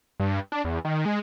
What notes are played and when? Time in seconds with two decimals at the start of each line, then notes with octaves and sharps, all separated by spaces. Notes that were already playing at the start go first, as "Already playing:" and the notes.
0.20 G2
0.52 D4
0.65 E2
0.85 D#3
1.05 G#3